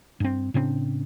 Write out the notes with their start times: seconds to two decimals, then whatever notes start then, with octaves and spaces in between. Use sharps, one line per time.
0.20 G2 C4
0.54 A2 C#3 C4 D4